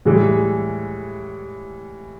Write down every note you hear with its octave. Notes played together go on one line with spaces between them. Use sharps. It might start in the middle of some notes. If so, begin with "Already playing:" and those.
A2 E3 G3 G#3